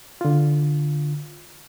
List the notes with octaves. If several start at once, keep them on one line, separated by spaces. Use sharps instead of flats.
D3 F4